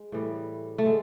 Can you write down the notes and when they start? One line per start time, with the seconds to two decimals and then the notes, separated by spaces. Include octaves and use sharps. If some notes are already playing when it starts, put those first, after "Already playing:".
Already playing: G#3
0.12 A2 E3 G3
0.78 A3
0.86 D3 G#3